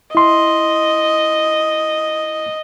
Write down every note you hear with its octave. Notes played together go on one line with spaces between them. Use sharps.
E4 D#5 C6